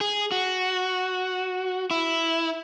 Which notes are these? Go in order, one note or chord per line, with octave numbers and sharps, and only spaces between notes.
G#4
F#4
E4